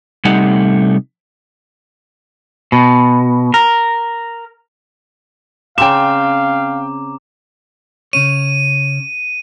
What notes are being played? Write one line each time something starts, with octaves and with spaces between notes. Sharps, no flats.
C3 G3 A3 D#4 F#5
B2
A#4
C#3 C4 F5 G5 A#5 D6 E7
C#3 C#4 C#5 D#7